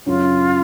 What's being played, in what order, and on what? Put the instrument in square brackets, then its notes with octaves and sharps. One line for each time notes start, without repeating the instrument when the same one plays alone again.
[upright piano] F#2 C#3 F#3 C#4 [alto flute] F4